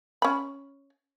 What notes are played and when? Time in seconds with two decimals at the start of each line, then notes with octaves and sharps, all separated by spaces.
0.22 C#4 B5